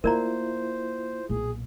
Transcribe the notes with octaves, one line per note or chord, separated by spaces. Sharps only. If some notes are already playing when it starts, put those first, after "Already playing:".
A#3 E4 F4 A#4 C5 D5 A#5
B1 A#2 G#4